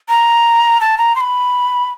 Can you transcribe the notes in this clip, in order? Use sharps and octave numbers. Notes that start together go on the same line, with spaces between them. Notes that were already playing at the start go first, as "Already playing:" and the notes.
A#5
A5
A#5
C6
B5